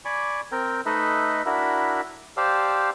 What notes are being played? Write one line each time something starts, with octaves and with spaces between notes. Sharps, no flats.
D5 G#5 B5 C#6 D6
C4 A#4 G5
A3 D#4 A4 B4 D#5 E5
D4 E4 F#4 A#4 E5 B5
G4 C5 D5 F5 A5 E6